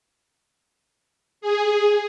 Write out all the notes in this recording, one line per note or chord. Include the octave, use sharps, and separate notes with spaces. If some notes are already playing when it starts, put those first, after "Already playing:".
G#4